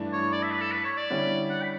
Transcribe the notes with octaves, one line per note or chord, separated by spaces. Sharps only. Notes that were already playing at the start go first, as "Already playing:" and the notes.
Already playing: G2 E3 A3 D4
C#5
D5
E5
B4
A4
B4
C#5
D5
D3 G3 C#4 E4
F#5
B5